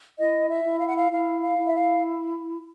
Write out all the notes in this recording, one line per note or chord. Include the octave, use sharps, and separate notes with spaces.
E4 D#5
E5
E4
F5
F#5
F5
E4 F5
F5
E4
E5
F5